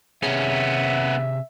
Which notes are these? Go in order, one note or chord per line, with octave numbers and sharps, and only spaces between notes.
C3 B3 C#4 G#4 E5